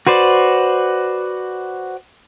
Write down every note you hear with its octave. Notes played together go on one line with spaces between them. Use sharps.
F#4 B4 C5 D5